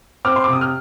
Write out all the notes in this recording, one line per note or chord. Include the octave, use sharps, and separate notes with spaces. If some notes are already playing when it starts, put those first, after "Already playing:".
C4 D6 F6
C6
D6
C3
D#6
F6